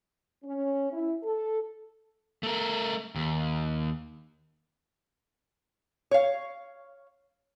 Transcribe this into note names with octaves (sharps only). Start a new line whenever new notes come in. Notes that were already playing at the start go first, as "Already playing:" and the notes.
C#4
E4
A4
A3 A#4
D#2
C#5 F5